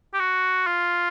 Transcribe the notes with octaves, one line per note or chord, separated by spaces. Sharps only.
G4
F#4
F4